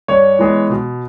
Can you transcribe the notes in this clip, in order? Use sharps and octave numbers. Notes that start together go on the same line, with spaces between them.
G2 C#5
E3 G#3 B3
B2